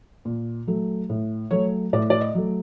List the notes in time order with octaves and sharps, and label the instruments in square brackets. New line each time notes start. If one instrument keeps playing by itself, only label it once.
[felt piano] A#2
F#3 A3
A2
F#3 A3 C#5
A2 D5
D5
D#5
F#3 A3